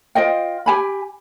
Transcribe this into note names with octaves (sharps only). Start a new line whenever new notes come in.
F4 C5 D#5 G5
G4 G#5 B5